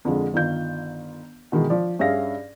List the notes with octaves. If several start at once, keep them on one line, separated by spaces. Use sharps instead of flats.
F2 D3 F3 G#3
G1 D#3 F4 G6
B2 D#3 E3 G#3
F3 D5
G2 C#4 G#4 E5 F5 A#6